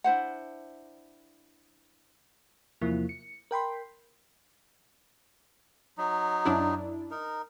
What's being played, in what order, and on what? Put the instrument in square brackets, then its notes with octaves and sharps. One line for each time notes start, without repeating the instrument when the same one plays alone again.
[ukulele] D4 E4 C5 F#5
[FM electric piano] E2 C3 F3 A#3 E4
C#7
A#4 G5 B5 C6
[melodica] F#3 D#4
[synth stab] F#2 D4 E4
[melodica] D#4 A#4